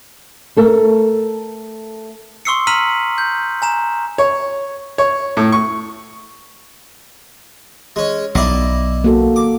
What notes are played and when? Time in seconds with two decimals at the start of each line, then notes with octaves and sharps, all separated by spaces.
0.56 A3 A4 A#4
2.45 C6 C#6 D#6 E6 C7 C#7
2.67 A#5 E6 F6 B6 D#7 F#7
3.18 G6
3.62 G#5 A#5 E7
4.18 C#5
4.98 C#5
5.37 A2
5.52 C#6
7.96 G#3 C#4
8.35 B1 E4 D5 D#5
9.04 A#3 F#4 A4
9.36 D6